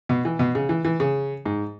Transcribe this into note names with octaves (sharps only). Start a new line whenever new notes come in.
B2
E3
B2
C#3
E3
E3
C#3
G#2